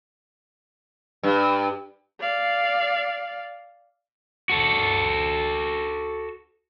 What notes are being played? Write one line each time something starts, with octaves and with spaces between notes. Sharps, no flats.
G2
D5 F5
F#4 A4